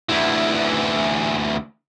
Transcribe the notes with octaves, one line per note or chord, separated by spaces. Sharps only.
D2 E3